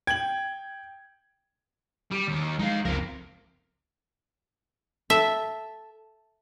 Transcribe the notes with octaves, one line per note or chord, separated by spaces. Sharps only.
G5 G#6 F#7
G3
D#2
F3 G#3 D#4 F5
F#1 C#2 F3 C4 A#4
A4 E5